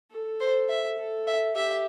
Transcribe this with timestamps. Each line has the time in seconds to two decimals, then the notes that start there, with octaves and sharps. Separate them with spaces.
0.11 A4
0.40 C5
0.69 E5
0.98 A4
1.27 E5
1.56 G4 E5